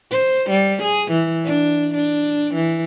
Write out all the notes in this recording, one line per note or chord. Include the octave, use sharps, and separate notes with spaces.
C5
G3
G#4
E3
D4
D4
E3